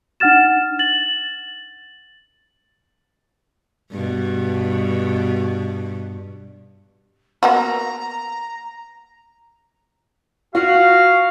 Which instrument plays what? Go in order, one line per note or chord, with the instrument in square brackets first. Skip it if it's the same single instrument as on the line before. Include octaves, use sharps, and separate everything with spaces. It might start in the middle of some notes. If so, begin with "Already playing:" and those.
[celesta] D4 D#4 F#5 F6 A6 E7
A6 F#7
[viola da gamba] G2 B2
[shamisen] A#3 B3 F#4 [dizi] A#5
[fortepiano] F4 [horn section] F#4 [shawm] F5